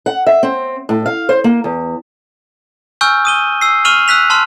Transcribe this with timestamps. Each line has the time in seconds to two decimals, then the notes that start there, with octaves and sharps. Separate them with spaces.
0.06 F#5
0.27 E5
0.43 C4
0.89 A2
1.06 F5
1.29 C5
1.44 A#3
1.64 E2
3.01 G#5 C#6 E6 F6 G6
3.25 D#6 D#7 G7
3.61 E6 C7
3.85 C#6 F6 D#7 F7 F#7
4.08 E6 F#6 B6 F7
4.30 A5 C6 F6